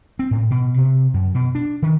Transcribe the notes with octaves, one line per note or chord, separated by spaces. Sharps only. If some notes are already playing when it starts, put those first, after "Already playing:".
C4
A2
B2
C3
F#2
B2
D4
D#3